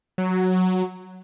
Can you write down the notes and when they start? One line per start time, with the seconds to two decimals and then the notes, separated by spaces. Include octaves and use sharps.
0.18 F#3